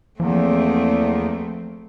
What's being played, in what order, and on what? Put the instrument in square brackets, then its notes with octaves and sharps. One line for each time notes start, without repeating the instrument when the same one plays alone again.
[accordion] E2 [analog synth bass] F3 [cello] A3 C4 [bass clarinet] A#3